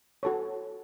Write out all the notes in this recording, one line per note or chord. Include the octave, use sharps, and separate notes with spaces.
F#4 A4 C#5